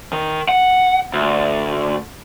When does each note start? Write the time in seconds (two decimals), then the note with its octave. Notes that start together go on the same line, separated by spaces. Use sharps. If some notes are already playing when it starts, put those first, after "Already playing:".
0.13 D#3
0.49 F#5
1.13 D2